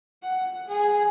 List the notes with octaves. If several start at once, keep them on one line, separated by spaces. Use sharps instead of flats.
F#5
G#4